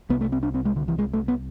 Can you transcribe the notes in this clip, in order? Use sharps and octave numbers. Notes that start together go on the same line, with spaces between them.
C2 C3 B3
A3
C4
D4
C4
G#3
D3
E3
G#3
A3
B3